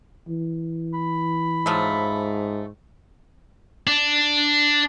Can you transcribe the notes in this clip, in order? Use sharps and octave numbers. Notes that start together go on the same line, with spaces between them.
E3
B5
G#2 F3 F#3 A3
D4